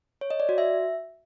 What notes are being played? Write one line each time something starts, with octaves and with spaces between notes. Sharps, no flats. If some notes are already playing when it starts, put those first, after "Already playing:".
C#5
D#5
D5
F#4
E5